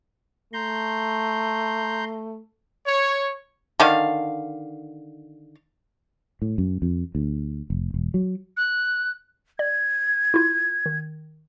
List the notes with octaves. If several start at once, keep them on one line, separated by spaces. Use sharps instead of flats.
A3 A#5 C6 G6
C#5
D3 D#3 F5
A2
F#2
F2
D2
F1
E1
F#3
F#6
D5 G#6
E4 F4
D#3